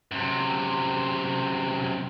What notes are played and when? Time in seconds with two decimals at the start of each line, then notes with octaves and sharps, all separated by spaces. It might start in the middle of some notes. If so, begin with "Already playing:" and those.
0.11 F#2 C3